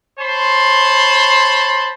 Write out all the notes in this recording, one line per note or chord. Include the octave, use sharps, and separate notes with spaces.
C5 C#5 A5 B5 C6